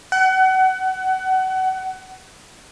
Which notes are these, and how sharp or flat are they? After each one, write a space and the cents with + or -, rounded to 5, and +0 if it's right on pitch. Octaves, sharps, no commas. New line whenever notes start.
F#5 +30